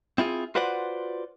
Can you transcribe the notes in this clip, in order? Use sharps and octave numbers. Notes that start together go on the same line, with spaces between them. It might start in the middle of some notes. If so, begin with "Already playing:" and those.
C4 E4 F4 G#4
F4 F#4 B4 C5 D5 F#5